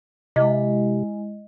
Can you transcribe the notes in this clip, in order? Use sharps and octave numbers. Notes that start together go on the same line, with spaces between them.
C3 G#3 E4 D#5